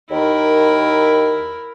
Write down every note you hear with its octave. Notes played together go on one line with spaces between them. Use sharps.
D#2 E4 A#4